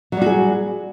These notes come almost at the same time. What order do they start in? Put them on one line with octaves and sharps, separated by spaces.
F#3 G3 F#4 G#4